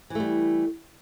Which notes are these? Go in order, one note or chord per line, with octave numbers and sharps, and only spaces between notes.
E3 G3 A3